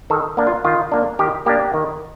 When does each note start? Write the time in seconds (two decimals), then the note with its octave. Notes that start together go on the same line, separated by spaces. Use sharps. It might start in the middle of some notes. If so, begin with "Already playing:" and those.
0.10 D#3 A4
0.37 A#3 D4
0.47 F4
0.65 D#3 F4
0.92 A#3 D4
1.19 D#3 G4
1.46 A#3 D4 G4
1.74 D#3